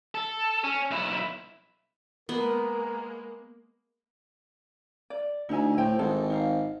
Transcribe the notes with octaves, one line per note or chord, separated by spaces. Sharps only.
A4
C#4
B1 E4
G#3 A#3 B3 A#4
D5
D2 D#4 E4 G#5
A2 E4 C5 G5
G#1 G#4 A4 C5
D#4 F5